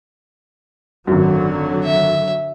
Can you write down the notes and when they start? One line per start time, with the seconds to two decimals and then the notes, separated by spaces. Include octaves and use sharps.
1.07 G#1 F#2 D3 F#3
1.84 E5